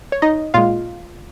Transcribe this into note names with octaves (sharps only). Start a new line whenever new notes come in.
C#5
D#4 D#5
A#2 G#3 F4 F5